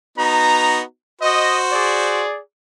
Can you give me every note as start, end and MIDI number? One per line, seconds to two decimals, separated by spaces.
0.18 0.82 59
0.18 0.82 63
0.18 0.82 66
0.18 0.81 82
1.22 2.22 66
1.22 2.22 72
1.22 1.57 75
1.72 2.39 68
1.72 2.39 74